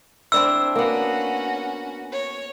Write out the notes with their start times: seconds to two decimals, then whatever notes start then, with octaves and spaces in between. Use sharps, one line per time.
0.32 C4 D4 E4 E6
0.76 A#3 B3 C#4 F#4
2.13 C#5